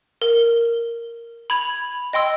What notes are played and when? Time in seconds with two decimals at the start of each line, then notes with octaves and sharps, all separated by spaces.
0.22 A#4
1.50 B5 G#6 F7
2.13 D#5 G5 C6 E6